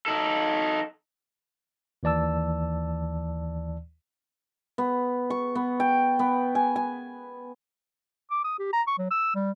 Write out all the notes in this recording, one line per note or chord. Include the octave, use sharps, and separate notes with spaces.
D#4 A4
D#2 E3 D5 A5 E6
B3
C#6
B3
G5
B3
G#5
G#5
D6
D#6
G4
A#5
C#6
F#3
E6
G3